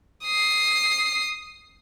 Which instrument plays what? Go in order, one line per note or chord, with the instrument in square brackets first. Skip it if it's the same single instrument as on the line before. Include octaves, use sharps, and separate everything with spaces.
[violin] D#6 C7